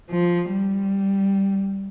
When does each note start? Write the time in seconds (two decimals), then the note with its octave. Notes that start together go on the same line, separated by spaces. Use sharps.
0.11 F3
0.51 G3